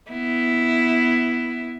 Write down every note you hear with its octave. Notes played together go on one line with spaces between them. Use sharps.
B3 E4